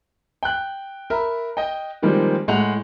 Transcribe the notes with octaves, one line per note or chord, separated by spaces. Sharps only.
G5 F#6
A#4 E5 B5
D#5 G5
D#3 F3 G3 G#3 A#3 C4
A2 G#3 F#5 F7